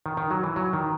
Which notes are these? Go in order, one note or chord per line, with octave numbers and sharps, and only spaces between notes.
D#3
D#3
F#3
E3
F#3
D#3